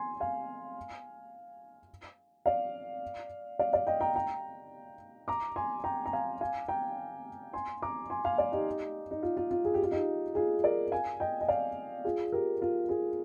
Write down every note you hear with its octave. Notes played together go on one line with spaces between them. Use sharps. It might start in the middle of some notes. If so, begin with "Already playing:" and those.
Already playing: G#5 C6
F5 G#5
D5 F5
D5 F5
D5 F5
D#5 G5
G5 A#5
G5 A#5
A#5 D6
G#5 C6
G5 A#5
A#5
F5 G#5
F5 G#5
G5 A#5
G#5 C6
A#5 D6
G#5 C6
F5 G#5
D5 F5
D#4 G4
D#4
F4
F4
F4
G#4
G4
F4
D#4 G4
F4 G#4
A#4 D5
F5 G#5
D#5 G5
D#5
D5 F5
F4 G#4
G4 A#4
F4
F4 G#4